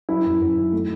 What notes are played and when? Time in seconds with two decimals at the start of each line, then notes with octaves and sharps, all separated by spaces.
0.09 F#3 E4 E5
0.26 F#2
0.41 F#2
0.58 D#3
0.72 A3